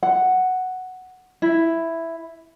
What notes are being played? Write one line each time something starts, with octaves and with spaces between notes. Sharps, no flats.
F#5
E4